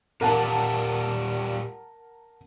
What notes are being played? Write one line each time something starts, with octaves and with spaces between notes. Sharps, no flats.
A#2 G3 A#4 F#5 A5